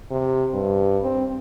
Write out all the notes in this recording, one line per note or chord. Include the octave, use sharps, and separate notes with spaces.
C3
G2
C4